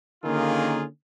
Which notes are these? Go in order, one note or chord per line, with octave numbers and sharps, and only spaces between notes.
D3 D#3 A#3 C#4 F4 G#4